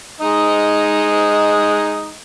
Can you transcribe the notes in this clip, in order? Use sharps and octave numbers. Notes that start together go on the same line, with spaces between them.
G#3 D#4 D#5